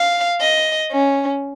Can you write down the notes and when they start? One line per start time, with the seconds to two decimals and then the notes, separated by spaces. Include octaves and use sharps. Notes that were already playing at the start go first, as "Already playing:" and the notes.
Already playing: F5
0.41 D#5
0.92 C#4